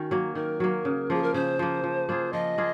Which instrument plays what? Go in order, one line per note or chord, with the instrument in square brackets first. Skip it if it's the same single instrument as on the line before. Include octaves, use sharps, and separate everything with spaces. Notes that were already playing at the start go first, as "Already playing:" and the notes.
Already playing: [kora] D#3 C#4 [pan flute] F#4
[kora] F#3 A#3
[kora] D#3 [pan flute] A#4
[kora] F#3 A#3
C#3
[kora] F3 A#3 [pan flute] G#4
[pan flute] A#4
[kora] C#3 [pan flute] C5
[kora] F3 A#3
F3
A#3 F4 G#4
[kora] F3 [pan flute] D#5
[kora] A#3 F4 G#4